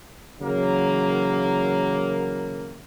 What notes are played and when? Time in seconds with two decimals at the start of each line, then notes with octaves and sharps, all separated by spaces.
0.41 C#3 E3 F#3 A#3